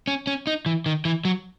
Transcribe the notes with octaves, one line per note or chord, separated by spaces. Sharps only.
C#4
C#4
D#4
E3
D#3
E3
F#3